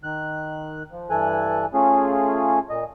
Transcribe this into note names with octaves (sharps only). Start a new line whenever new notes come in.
D#3 F#6
F3
G2 E3 A4 G#5 F#6
A3 C#4 F4 G#4
A#2 D#5